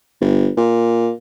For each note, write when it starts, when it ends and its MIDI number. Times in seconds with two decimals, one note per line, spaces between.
0.21 0.49 31
0.57 1.11 46